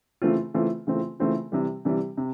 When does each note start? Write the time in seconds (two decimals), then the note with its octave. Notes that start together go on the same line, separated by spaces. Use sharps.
0.22 C#3 E3 A3 C4 F4
0.54 C#3 E3 A3 C4 F4
0.87 C#3 E3 A3 C4 F4
1.20 C#3 E3 A3 C4 F4
1.52 C3 E3 G3
1.85 C3 E3 G3
2.17 C3